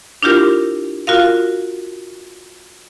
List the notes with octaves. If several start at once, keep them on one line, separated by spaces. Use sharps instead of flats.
D4 E4 F4 G4 A#4
F4 F#4 A#4 F5